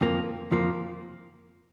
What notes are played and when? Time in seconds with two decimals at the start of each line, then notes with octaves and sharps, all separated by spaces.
0.01 F2 F3 A#3
0.51 F2 F3 A#3